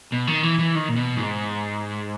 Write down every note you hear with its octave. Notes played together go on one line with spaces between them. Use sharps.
B2
D#3
E3
E3
D#3
A#2
B2
G#2